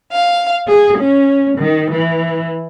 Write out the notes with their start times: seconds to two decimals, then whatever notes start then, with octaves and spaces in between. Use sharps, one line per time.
0.12 F5
0.68 G#4
0.98 C#4
1.58 D#3
1.92 E3